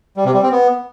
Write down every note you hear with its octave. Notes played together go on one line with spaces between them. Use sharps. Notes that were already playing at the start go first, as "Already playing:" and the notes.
G3
C3
G3
C4
B3